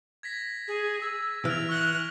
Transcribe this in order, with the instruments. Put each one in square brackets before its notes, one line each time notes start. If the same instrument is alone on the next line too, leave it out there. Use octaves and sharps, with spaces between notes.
[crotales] G#6 A#6 B6
[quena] G#4
E6
[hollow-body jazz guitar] E3 [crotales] F6 D7 F7
[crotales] C#6 G7 [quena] F#6